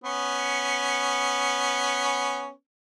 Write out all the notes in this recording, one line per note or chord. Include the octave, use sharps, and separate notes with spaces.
B3 C#4